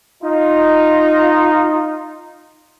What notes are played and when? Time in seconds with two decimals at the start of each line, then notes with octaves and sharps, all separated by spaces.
0.23 D#4 F4